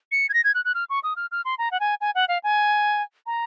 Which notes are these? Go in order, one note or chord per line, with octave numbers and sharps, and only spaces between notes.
C#7
G#6
A#6
G#6
F#6
F#6
F6
C#6
D#6
F6
F6
C6
A#5
F#5
G#5
G#5
F#5
F5
G#5
A#5